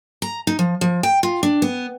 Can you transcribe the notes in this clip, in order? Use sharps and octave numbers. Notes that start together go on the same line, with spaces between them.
A#5
D#4
F3
F3
G5
F4
D4
B3